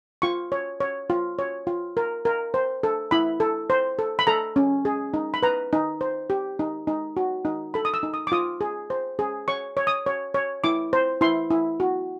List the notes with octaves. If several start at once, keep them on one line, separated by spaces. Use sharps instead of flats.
F4 C#6
C#5
C#5
F4
C#5
F4
A#4
A#4
C5
A4
E4 B5
A4
C5
A4
B5
A4 A#5
C#4
G#4
D#4
B5
B4 A#5
D#4
C5
G4
D#4
D#4
F#4
D#4
A4 B5
D#6
E6
D#4
D#6
D6
F4 D#6
G#4
C5
G#4
C#5 C#6
C#5
D#6
C#5
C#5
E4 D6
C5
E4 C6
E4
F#4